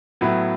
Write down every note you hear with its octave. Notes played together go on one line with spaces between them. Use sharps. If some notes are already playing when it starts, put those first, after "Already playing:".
A2 F#3 B3 E4 B4